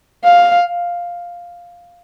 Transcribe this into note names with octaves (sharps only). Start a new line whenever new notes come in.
F5